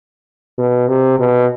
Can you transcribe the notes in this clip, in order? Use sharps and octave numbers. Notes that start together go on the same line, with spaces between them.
B2
C3
B2